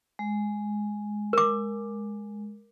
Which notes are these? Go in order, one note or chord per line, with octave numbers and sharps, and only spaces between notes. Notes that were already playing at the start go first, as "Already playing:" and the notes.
G#3
A#4 D6